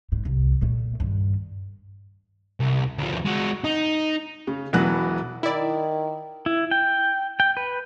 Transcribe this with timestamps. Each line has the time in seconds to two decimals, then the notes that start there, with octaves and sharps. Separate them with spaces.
0.12 G#2
0.25 C2
0.61 A#2 A3
1.00 G2 D#3
2.60 C2
2.98 D2 F3
3.25 G#3 F#4
3.64 D#4
4.47 C#3
4.73 E1 E3 F#3 B3 F#6
5.43 D#3 E4 D5
6.46 E4
6.71 G5
7.40 G5
7.57 B4